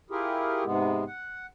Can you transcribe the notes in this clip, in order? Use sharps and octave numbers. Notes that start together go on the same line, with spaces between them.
E4 F4 G4 G#4 A#4
G#2 C3 G#3 B3
F#5